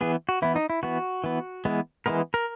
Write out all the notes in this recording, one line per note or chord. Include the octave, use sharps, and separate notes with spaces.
E3 B3 G#4
F#4
E3 B3 E4
D#4
E4
E3 B3 F#4
E3 B3
E3 G#3 B3
E3 G#3 B3 A#4
A#4